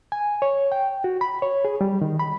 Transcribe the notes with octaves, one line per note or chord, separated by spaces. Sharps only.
G#5
C#5
G5
F#4
B5
C#5
G#4
G3
D#3
B5